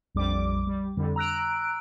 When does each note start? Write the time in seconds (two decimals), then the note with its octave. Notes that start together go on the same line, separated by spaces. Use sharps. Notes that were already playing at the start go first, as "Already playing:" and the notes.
0.15 A#1 F2 G3 D6
0.67 G3
0.97 F2 D3 G3
1.16 A#5 E6 F#6 D7